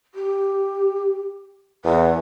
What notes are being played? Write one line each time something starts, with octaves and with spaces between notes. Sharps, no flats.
G4
E2 B4